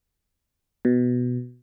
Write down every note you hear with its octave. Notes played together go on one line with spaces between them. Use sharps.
B2